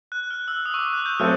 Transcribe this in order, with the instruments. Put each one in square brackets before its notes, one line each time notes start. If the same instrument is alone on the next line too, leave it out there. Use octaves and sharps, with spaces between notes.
[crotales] F#6
F6
E6
D#6
C#6
D6
F#6
G6
[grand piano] F#3 A3 C4 [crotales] F6